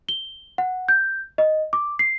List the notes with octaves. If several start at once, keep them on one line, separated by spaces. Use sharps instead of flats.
G7
F#5
G6
D#5
D6
C7